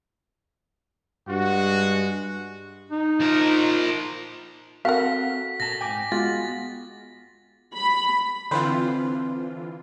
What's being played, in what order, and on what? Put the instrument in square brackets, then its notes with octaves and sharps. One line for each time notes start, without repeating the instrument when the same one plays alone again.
[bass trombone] G2 [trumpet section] G#3 F#4
[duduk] D#4
[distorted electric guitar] F3 A#4
[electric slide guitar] C4 [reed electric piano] F#4 A4 F#5 [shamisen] A#4 F5 [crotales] B6
[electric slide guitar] A#2 A5 [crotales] A#6
[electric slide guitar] G#2 G#5 [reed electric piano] G5 D6
[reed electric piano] G#3 F4 F#4 [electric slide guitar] B3 [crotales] A6
[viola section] B5
[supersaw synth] D3 E3 F4 [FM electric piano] C4 B4 C5